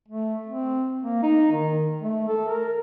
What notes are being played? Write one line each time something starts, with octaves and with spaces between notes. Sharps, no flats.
A3
C4
A#3
D#4
D#3
A3
A4
A#4